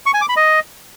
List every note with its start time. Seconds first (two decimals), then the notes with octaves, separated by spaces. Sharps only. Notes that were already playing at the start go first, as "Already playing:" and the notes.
0.06 C#6
0.14 G#5
0.21 D6
0.29 B5
0.36 D#5